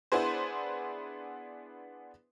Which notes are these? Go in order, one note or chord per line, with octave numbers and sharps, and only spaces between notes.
B3 D4 E4 G#4 B4 C5